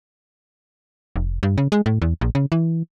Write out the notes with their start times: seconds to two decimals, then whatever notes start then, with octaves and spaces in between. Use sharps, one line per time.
1.16 F1
1.43 G2
1.58 C#3
1.72 G#3
1.86 A2
2.02 E2
2.21 A#1
2.35 C#3
2.52 E3